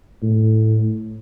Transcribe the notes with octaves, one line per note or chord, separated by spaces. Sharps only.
A2